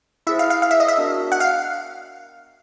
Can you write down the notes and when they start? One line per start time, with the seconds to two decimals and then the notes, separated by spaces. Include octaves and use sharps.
0.27 E4 G#4 C5 E5
0.39 F5
0.50 F5
0.62 F5
0.71 E5
0.80 D#5
0.88 E5
0.97 B3 D4 F#4 A#4 D#5
1.32 F#5
1.40 F5